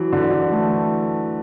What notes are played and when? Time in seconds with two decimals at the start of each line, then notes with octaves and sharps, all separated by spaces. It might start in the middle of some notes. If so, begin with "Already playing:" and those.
Already playing: E3 F#3
0.13 D3
0.31 E3
0.52 A3